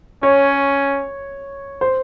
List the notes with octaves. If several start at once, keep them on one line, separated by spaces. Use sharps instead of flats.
C#4 C#5
C5